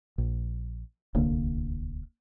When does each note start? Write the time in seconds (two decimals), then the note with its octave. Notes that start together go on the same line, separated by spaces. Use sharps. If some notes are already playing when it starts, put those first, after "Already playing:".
0.18 A#1
1.15 D1 C2 D3 A#3